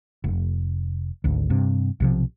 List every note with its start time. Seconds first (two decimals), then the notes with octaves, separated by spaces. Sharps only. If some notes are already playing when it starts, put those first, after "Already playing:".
0.24 F1
1.24 G#1 D2
1.50 G2 C3
2.00 B1 C3 F3